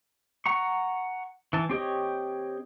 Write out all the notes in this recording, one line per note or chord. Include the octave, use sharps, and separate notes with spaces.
F#5 A#5 C#6
E3 A5
C4 G4 C#5 D#5